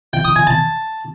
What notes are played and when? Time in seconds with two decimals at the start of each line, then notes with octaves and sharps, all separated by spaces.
0.13 G5
0.25 D#6
0.36 G#5
0.47 A5